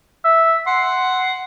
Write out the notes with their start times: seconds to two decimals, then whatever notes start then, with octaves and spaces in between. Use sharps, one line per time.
0.25 E5
0.67 F#5 C6